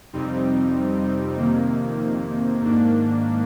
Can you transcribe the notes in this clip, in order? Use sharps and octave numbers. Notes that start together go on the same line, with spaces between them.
F2 C3 G3 C4 D#4
F2 C3 D#3 A#3
G#2 D#3 A#3 D4